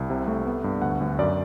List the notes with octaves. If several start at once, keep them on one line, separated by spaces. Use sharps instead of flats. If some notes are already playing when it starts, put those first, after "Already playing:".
Already playing: C2
C3
A3
B3
G2
D2 F#5
D2
F#2 D5